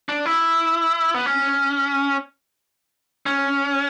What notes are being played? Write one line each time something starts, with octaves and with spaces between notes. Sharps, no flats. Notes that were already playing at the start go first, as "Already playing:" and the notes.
D4
E4
B3
C#4
C#4